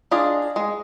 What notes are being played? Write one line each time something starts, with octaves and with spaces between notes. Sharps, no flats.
D4 F4 G#4 D#5
G#3